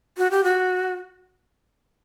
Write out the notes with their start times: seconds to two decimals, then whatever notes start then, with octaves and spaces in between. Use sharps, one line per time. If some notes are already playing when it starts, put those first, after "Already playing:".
0.18 F#4
0.31 G4
0.44 F#4